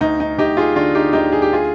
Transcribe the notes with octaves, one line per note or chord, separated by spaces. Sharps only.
D2 D#4
D#4
D2 D#4 G4
F4 G#4
D3 D4 F4
D#4 G4
D2 D#4 G4
G#4
G4
F4 G#4